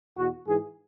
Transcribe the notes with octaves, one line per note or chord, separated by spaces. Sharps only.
E2 B2 F#4
G#2 E3 G#4